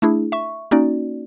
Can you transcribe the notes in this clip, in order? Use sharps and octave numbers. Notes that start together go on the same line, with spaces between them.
A3 D4 E4 G#4
E5 C#6
A#3 C#4 D#4 F#4 D5